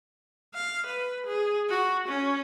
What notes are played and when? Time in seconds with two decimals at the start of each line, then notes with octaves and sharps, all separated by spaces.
0.54 F5
0.86 B4
1.26 G#4
1.69 F#4
2.08 C#4